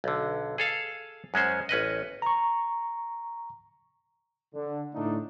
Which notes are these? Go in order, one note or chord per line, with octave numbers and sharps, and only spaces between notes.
B1 D3
G#4 A4 F5
F#2 G#3 C#4 C5
A1 C#4 B4 D#5
A#5 C#6
D3
A2 D3 A3 D4 D#4